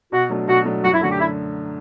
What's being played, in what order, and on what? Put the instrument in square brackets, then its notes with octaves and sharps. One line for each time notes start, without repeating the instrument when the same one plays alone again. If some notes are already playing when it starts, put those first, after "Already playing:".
[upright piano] B2 [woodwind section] F#4
[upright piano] F#3 A3 D4
[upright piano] B2 [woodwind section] F#4
[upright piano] F#3 A3 D4
[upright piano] F#2 [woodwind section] F#4
[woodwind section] E4
[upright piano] D3 A3 [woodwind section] F#4
[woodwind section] G4
E4